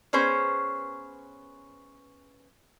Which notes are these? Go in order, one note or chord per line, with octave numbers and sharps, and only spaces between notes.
B3 C#4 G#4 C5 C#5